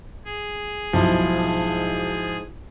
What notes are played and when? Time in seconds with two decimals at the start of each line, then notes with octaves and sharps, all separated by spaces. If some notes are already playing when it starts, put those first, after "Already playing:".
0.25 G#4
0.93 B1 G#2 F3 E4